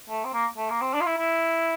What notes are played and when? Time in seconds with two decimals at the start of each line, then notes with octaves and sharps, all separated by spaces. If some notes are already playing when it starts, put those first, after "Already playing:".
0.09 A3
0.25 C4
0.33 A#3
0.57 A3
0.70 A#3
0.82 C4
0.94 D4
1.01 F4
1.06 E4
1.18 E4